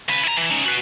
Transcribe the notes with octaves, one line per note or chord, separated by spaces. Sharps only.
C#3 B4
E4 A#5
E3
C#4 D#4
F#4 B4